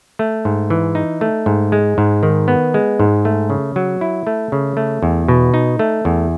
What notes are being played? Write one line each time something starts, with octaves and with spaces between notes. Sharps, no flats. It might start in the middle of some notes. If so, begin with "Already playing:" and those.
A3
G#2
E3
D#4
A3
G#2
G#3
G#2
D#3
B3
G#3
G#2
A3
C#3
F#3
E4
A3
C#3
A3
E2
B2
D#4
A3
E2